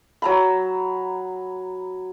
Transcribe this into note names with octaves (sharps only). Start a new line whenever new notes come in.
F#3 A#5 B5